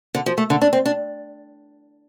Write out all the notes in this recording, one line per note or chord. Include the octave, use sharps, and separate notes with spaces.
D3
F3
A3
D3
D4
C4
D4